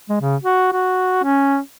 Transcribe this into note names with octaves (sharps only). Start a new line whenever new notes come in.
G#3
C#3
F#4
F#4
C#4